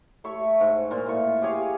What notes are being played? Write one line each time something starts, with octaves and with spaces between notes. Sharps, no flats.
A3 C#5 E5 C#6
G#2
A#2 F4 A#4
A2 C#6
G4 G#4 C#5 F5